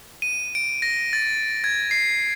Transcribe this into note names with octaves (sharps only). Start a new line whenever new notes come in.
D#7
D7
A#6
A6
G#6
C7